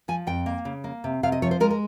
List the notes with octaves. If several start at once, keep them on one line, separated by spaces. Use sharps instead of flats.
F3 G#5
F2 G5
A#3
C#3
A#3
C3
C3 F5
D#5
F3 C#5
C5
G#3 A#4
A#4